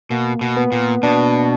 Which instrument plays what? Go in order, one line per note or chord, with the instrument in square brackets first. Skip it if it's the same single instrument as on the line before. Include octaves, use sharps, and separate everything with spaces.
[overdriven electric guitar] B2 [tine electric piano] A#3
[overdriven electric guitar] B2
[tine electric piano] B3
[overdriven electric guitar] A#2
[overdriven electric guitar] B2 [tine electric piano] D4